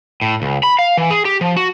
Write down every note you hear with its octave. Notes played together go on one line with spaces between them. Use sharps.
A2
C#2
B5
F5
E3
G#4
G4
F3
F#4